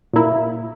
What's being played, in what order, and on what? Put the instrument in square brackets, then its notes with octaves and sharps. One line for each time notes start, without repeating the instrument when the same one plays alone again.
[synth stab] A#2 A#3 E4